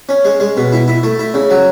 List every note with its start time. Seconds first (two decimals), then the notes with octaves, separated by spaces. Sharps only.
0.09 C#4
0.25 G#3
0.40 G#3
0.57 B2
0.72 E4
0.88 E4
1.03 A3
1.19 E4
1.34 C#3
1.50 F#3